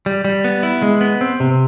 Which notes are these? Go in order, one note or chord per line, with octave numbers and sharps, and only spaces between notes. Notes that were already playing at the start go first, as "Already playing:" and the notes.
G3
G3
B3
E4
G#3
B3
C4
C3